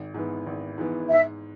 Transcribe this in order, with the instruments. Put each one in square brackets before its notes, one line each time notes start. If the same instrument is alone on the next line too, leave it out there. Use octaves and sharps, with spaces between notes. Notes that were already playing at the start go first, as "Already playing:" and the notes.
Already playing: [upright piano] G#1
G#2 E3 B3
G#1
G#2 E3 B3
[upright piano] G#2 [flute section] E5